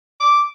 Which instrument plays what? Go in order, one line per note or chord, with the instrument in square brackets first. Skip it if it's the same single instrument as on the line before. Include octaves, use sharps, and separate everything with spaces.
[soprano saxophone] D6